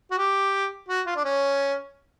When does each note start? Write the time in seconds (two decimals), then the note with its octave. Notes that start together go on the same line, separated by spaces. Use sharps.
0.11 F#4
0.18 G4
0.88 F#4
1.06 F4
1.16 D4
1.25 C#4